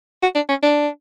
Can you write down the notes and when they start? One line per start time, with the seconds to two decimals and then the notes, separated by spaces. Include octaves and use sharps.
0.22 F#4
0.35 D4
0.49 C#4
0.63 D4